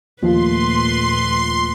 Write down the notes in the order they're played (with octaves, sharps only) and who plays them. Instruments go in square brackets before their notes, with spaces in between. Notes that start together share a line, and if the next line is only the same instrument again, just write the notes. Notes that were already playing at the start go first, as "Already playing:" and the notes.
[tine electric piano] D#2 [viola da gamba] A#2 A3 B4 [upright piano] F3 F4 [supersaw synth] C6